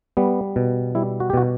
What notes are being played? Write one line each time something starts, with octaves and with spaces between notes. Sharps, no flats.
G3 B3
B2
G3 E4
F#4
G4
B2 F#4